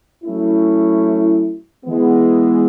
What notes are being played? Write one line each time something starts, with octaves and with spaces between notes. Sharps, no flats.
F#3 A3 C#4 E4
E3 G#3 B3